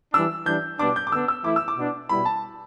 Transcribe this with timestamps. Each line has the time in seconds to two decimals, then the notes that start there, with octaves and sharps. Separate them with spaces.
0.13 E3 G3 D4 E6
0.46 E3 G3 D4 G6
0.79 B2 G3 B3 D4 D6
0.96 G6
1.07 D6
1.11 D3 B3 D4 E6
1.28 E6
1.44 E3 A3 E4 D6
1.56 E6
1.68 D6
1.77 B2 B3 D4
2.09 B2 G3 B3 E4 B5
2.25 A5